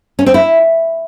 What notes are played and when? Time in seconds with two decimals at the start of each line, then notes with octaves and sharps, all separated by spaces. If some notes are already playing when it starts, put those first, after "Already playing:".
0.19 C#4
0.26 C4
0.34 E4